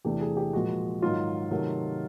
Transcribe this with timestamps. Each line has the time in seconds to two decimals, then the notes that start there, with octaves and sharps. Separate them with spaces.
0.05 E2 C3 E3 A3 D4 G4
0.21 G#4
0.37 G4
0.53 A#2 F3 G#3 F#4
1.02 G#2 D#3 F#3 F4
1.51 C3 D#3 F#3 A3